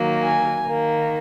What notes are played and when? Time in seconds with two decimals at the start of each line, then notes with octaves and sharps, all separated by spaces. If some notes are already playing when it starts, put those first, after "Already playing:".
Already playing: D#3 F#3 A#3
0.22 G#5
0.65 D#3 A#3